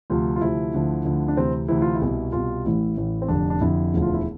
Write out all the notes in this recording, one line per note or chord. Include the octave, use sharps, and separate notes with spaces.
D2 C3 F3 F4
F4
D2 C3 F3 E4
D2 D3 F3
D2 D3 F3
D4
D2 C3 E3 C4
D2 C3 E3 E4
F4
E4
C2 B2
C2 B2 F4
A1 A2 E3 E4
A1 A2 E3
C4
F1 F2 D3 D4
D4
F1 F2 D3 E4
E1 D2 D3 F3
F4
E4